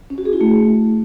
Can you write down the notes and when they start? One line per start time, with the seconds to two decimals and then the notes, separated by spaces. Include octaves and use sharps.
0.10 C#4
0.18 F#4
0.25 G#4
0.33 E4
0.41 A3